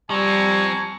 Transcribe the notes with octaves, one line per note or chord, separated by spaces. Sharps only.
F3 G3 C4 G#5 A#5 C#6